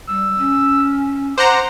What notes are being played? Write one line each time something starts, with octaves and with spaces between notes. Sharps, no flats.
G3 E6
C#4
C5 F#5 A#5 D6